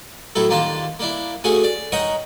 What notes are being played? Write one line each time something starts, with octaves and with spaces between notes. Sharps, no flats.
A2 F#3 E4 A4
D#2 A#3 D4 F4 A5
A#3 D4 E4
A3 C#4 F#4 G#4
D5
D#4 A#4 C#5 D#5 F#5 G5